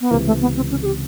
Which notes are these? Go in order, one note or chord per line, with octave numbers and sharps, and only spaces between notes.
B3
C#2 C3 E3 A#3
A3
B3
C4
C#4
G#4
G4